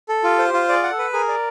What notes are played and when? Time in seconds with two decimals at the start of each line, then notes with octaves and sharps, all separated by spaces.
0.09 A4
0.24 F4 G4
0.38 C5
0.46 G4
0.54 F4
0.69 G#4 D5
0.84 F#5
0.92 A4
0.99 B4
1.13 G#4 A#4
1.28 D5